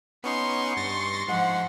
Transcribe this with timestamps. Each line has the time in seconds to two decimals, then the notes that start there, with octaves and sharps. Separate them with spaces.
0.24 B3 C#4 D#4 C6 C#6
0.77 G2 A6 A#6
1.28 G#2 F3 G#3 F#5